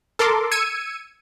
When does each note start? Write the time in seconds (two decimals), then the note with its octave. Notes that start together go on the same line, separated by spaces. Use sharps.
0.19 A4 A#4 C6 D6
0.51 E6 G#6 C#7 D#7